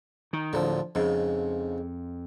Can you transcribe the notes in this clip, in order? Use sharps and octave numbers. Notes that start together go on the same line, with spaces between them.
D#3
D1 D3 F3
F2 G#2 C#3